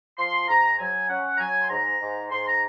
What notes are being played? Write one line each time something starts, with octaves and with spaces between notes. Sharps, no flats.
F3 C6
G#2 A#5
F#3 G#5
C#4 F#5
A#5
F#3 G#5
C6
G#2 A#5
G#2
G#2 C6
A#5